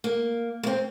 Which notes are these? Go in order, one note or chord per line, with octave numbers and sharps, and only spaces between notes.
A#3
A#3
C4